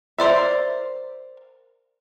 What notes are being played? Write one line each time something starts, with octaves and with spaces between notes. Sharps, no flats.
A#4 C5 D5 E5